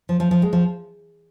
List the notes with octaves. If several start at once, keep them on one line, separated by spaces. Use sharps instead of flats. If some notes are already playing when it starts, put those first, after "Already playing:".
F3
F3
F3
G#3
F3